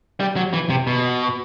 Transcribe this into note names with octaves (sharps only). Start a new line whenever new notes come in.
G3
F#3
E3
C3
B2